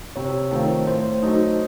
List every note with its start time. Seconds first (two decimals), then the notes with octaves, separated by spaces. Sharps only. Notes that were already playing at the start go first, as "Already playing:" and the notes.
0.16 C3 C#5
0.51 D#3 A3 C4 F4
0.87 A2 C5
1.22 F#3 A3 D#4